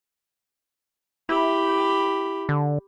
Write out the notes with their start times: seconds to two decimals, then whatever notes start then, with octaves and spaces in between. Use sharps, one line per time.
1.29 E4 G4 B5
2.49 D3